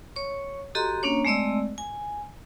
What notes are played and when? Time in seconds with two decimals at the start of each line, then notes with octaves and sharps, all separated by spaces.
0.16 C#5 C#6
0.75 F#4 G4 A4 D#5 A#5 C6
1.03 A#3 C#4 D4 C#5
1.25 G#3 A3 C4 D5 D#5 E6
1.78 G#5